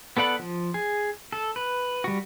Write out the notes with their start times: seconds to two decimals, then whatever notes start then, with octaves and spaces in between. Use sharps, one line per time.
0.17 B3 A4 D5 F#5 B5
0.39 F3
0.74 G#4
1.33 A4
1.56 B4
2.04 G3 F#4